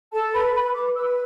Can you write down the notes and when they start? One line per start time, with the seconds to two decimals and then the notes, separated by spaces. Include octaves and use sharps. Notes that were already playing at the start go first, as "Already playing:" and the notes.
0.12 A4 A5
0.33 B4 B5
0.54 B4 B5
0.74 B4 D6
0.95 B4 E6